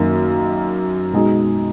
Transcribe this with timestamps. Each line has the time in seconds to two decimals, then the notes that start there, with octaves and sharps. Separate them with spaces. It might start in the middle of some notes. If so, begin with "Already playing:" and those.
Already playing: F#2 D#3 A#3 D#4
1.13 B2 G#3 D#4